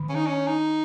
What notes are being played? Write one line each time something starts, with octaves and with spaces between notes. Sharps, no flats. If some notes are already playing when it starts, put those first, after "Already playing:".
Already playing: D#3
C#4
D#4
C#4
D#4